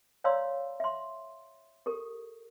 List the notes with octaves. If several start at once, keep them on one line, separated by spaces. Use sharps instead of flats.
C#5 D5 F5 A#5 C6 E6
E5 C6
G4 A4 A#4